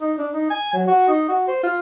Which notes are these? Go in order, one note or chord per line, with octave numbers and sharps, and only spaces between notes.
D#4
D4
D#4
G#5
F#3
F#4
D#4
F#4
C5
F4